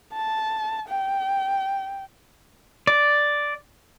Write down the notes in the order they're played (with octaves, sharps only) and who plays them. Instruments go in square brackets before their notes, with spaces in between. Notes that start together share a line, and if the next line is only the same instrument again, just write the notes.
[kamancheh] A5
G5
[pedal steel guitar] D5